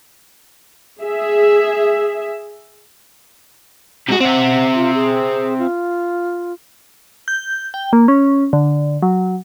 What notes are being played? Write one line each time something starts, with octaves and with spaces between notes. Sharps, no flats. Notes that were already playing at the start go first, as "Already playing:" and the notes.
G#4 E5
C3 G#3 F#4
C4 E5 F#5
F4
G#4
F4
G6
G5
A#3
C#4
D3
F#3